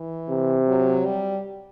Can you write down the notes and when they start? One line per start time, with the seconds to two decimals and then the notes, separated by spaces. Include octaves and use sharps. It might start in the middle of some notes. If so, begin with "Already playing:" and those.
Already playing: E3
0.29 C3
0.67 F#3
1.05 G3